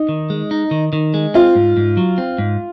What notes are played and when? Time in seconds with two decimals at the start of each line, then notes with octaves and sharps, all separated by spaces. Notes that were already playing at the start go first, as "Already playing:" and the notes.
Already playing: D#4
0.09 D#3
0.30 G#3
0.51 D#4
0.71 D#3
0.93 D#3
1.14 G#3
1.34 C4 F4
1.56 G#2
1.77 G#2
1.97 F#3
2.18 C4
2.38 G#2